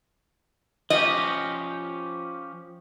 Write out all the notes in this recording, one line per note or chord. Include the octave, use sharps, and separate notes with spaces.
F3 C#4 G4 D#5